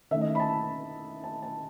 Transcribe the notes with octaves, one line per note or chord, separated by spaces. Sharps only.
D#3 A3 D#4 E5
D#5
B5
A5
A5
A5